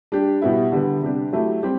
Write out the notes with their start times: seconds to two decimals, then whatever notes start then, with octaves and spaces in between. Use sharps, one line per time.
0.12 G3 D4 G4
0.42 B2 G3 B3 E4
0.72 D3 G3 B3
1.03 C3 G3 D4 G4
1.33 F#3 A3 E4 G4
1.63 G3 C4 G4